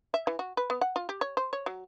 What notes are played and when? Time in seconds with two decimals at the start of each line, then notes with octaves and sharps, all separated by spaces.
0.14 E5
0.27 E3
0.39 F#4
0.57 B4
0.70 B3
0.81 F#5
0.96 F4
1.09 G4
1.21 C#5
1.37 C5
1.53 C#5
1.66 F#3